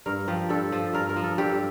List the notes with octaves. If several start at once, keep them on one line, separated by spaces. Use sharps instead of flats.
G2 A#4
F3 G4
G2 A4
F3
G2 A#4
A#4
F3
A4
G2 G4